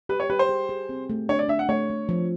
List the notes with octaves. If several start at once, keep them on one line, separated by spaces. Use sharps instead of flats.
G4 B4
C#5
G4 B4
C5
G#4
G#4
C4
A3
D4 C#5
D5
D4 E5
F#5
A3 C#5
A3
F3